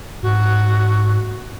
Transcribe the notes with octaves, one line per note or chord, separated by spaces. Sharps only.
G#2 F#4